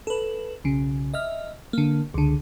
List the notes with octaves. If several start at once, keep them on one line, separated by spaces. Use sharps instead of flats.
A4 B4
B1 C#3
D#5 E5 F6
D3 A#3
C#2 D3